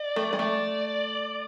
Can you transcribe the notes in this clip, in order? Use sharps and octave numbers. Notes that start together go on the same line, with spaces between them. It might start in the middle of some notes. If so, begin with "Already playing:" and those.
Already playing: D5
A3
G#3
A3 D5